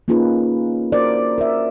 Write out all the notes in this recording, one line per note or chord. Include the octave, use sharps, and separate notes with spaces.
A#3 C#4 D#4 F4 G#4 B4
F#4 A#4 C5 D5
A#4 E5